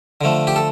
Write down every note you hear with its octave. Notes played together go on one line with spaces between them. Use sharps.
D3 F3 A3
G4
A4